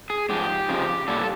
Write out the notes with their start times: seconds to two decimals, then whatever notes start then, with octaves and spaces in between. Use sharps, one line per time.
0.10 G#4
0.29 G#2 F3 G4
0.69 F2 C#3 F3
1.08 A#2 G3 A4